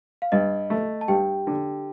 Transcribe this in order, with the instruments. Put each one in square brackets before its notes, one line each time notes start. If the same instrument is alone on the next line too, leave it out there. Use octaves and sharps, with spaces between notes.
[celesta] F5
[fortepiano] G2 [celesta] D#5
[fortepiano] A3
[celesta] A5
[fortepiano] G2 [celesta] G4 G5
[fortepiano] D3